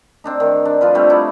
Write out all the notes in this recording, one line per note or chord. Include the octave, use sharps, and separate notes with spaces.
C4 D4 D#4
D#3
D4
F3 F4 B4
G3 A3 C4
D#4 E4 A4 D5